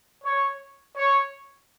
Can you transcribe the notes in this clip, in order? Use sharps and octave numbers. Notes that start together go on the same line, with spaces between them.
C#5
C#5